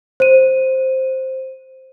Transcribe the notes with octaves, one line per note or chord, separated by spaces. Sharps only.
C5 D#7